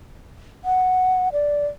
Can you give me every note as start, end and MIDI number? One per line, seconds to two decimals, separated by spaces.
0.64 1.29 78
1.33 1.66 74